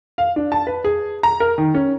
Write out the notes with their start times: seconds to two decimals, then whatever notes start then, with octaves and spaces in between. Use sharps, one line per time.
0.18 F5
0.36 D4
0.52 A5
0.67 B4
0.84 G#4
1.23 A#5
1.40 A#4
1.58 D#3
1.75 C#4